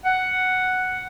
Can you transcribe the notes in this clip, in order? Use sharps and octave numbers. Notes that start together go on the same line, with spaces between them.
F#5